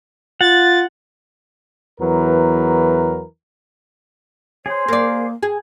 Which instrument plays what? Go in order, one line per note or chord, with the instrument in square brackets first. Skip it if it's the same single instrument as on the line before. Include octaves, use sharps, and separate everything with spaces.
[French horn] F4 [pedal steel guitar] F#5 [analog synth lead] A6
[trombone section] E2 E3 F#3 A#4 B4
[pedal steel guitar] G#4 C5 [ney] C#5
[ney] A#3 [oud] A#4 D5
[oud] G#4